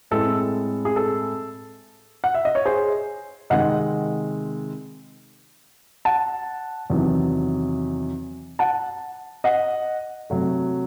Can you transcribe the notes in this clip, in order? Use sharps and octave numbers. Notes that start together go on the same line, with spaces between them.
A2 G#3 C4 A4
G#4
A4
F#5
E5
D#5
C#5
G#4 C5
C3 D#3 G#3 C4 D#5 F#5
F#5 A5
E2 C3 D#3 F#3
F#5 A5
D#5 F#5
C3 F#3 A3